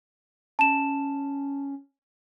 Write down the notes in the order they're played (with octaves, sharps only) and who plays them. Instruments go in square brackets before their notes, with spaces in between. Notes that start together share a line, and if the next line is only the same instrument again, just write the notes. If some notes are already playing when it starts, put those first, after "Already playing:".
[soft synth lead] C#4 [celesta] A5 E7